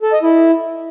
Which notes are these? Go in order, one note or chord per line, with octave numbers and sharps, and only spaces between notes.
A4
D#5
E4